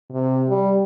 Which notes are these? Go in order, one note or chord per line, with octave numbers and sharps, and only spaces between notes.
C3
G3